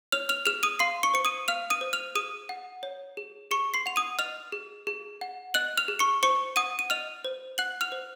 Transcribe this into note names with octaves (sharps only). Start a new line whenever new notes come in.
C#5 F6 F7
F6 F7
G#4 F6 F7
D#6 D#7
F5 C6 C7
C#6 C#7
C5 C#7
D#6 D#7
F5 F6 F7
D#6 D#7
C5
F6 F7
G#4 D#6 D#7
F#5
C#5
G#4
G#4 C#6 C#7
C6 C7
F#5 F7
D#6 D#7
D#5 F6 F7
G#4
G#4
F#5
D#5 F#6 F#7
F6 F7
G#4
C#6 C#7
C5 C#6 C#7
F#5 D#6 D#7
D#7
D#5 F6 F7
C5
F#5 F#6 F#7
F6 F7
C5